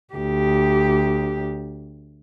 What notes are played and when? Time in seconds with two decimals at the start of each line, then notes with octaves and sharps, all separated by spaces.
0.14 D2 G4